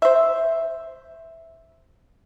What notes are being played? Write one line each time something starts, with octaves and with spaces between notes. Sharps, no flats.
C5 E5